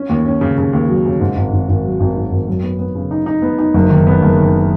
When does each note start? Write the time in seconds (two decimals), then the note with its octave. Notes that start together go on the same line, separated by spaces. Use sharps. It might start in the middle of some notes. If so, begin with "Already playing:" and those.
Already playing: C#4
0.09 D#2
0.26 C#4
0.41 C#3
0.58 C#3
0.73 D#2
0.88 F#3
1.05 C#3
1.20 G#2
1.36 G#1
1.53 G#1
1.69 G#1
1.84 F#3
2.00 G#1
2.16 G#2
2.31 G#1
2.47 F#2
2.63 B3
2.79 B3
2.95 C#3
3.11 D#4
3.26 D#4
3.42 B3
3.58 D#4
3.74 F#1
3.90 D#3
4.07 B3
4.22 F#1
4.37 D#3